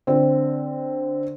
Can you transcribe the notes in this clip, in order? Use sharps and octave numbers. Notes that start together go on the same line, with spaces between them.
D3 C4